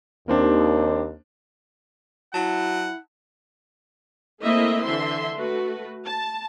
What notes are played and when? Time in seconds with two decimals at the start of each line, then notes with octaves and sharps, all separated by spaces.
0.28 D#2 A#3 C4 D4
2.34 F#3 E4 F#5 A5
4.43 A3 A#3 C4 E4 D#5 E5
4.83 D3 E3 E5 C6
5.35 A3 F#4 B4
6.05 A5